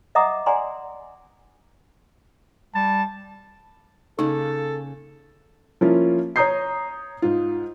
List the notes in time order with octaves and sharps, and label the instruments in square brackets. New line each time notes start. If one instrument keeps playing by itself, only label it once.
[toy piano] D#5 E5 F#5 A#5 D6 D#6
D5 F#5 G#5 A#5 C6
[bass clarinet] G3 [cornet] A5
[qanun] C#3 A#3 C#4 [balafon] D#4 [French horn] A4
[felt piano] F3 A#3 C#4 E4 F4
C#5 A#5 D#6 G6 C7
G#2 F4